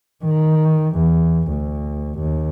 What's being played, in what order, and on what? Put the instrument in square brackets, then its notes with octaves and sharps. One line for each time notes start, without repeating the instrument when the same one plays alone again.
[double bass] D#3
E2
D2
D#2